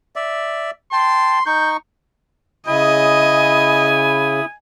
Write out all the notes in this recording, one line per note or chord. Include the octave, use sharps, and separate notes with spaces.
D5 E5
G5 A5 C6
D#4 C#6 G6
C#3 E4 D#5 G#5 B5 D#6